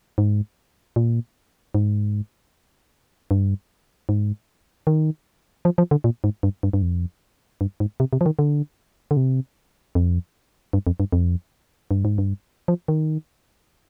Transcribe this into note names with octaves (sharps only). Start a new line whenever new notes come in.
G#2
A#2
G#2
G2
G#2
D#3
F3
F3
D3
A#2
G#2
G2
G2
G2
F2
G2
G#2
C3
C3
F3
D#3
D3
D3
C3
F2
G2
F2
G2
F2
G2
G#2
G2
F3
D#3